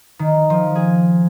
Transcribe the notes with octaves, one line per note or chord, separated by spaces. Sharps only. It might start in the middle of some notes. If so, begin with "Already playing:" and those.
D#3
F3
G#4